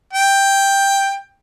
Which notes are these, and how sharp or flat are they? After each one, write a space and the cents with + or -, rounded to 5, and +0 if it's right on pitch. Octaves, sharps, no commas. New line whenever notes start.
G5 +10